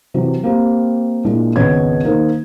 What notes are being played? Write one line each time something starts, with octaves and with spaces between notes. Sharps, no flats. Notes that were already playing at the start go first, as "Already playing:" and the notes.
C3 E3 F#3
A#3 C4 G4
A#2 G#3 D4 E4
G#1 C#2 B2 C#5 G#6
D#3 A#3 D#4 A#4 C5